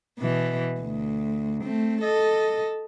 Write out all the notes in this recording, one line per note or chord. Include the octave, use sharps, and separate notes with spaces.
B2 E3
D2
A3 C4
A4 D#5